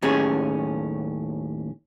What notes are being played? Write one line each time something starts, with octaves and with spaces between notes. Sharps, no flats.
D#2 A2 C#4 G#4